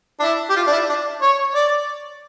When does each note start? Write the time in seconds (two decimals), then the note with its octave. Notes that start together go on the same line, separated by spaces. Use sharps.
0.19 D4
0.22 E4
0.50 G4
0.56 F4
0.67 D4
0.72 E4
0.89 D4
1.22 C#5
1.55 D5